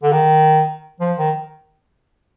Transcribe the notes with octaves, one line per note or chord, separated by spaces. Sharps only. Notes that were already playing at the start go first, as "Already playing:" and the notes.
D3
D#3
F3
D#3